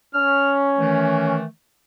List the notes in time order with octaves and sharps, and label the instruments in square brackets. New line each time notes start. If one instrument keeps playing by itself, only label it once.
[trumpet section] C#4 [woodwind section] F6
[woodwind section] D#3 E3 A3